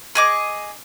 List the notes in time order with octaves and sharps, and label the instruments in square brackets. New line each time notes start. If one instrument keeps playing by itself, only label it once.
[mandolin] G#4 D#5 D6